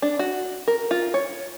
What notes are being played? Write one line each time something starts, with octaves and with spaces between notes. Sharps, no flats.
D4
F#4
A#4
F4
C#5